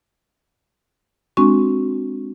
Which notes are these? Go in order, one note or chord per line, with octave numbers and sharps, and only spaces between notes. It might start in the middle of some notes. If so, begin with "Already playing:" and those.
G#3 C4 D4 F#4 C#6